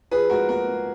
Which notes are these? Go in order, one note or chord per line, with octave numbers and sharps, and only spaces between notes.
F3 G#4 B4
G#2 F#4 A#4
A#3 F#4 A#4
A#3